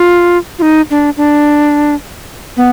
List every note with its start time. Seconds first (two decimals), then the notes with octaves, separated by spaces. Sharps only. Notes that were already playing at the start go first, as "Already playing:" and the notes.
Already playing: F4
0.59 F4
0.62 D#4
0.91 D4
1.17 D4
2.57 B3